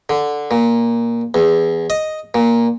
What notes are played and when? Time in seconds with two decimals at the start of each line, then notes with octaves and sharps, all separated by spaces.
0.09 D3
0.51 A#2
1.34 E2
1.90 D#5
2.34 A#2